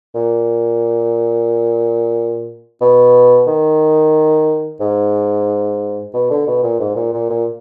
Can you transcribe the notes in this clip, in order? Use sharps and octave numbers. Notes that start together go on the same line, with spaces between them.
A#2
B2
D#3
G#2
B2
D3
B2
A#2
G#2
A#2
A#2
A#2